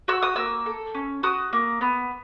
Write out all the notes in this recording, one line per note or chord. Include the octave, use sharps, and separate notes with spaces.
F#4 E6
D#6
A#3 E6
A4
C#4
F#4 D#6
A#3
B3